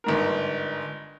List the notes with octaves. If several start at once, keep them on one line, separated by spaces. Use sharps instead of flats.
G1 G#2 A#4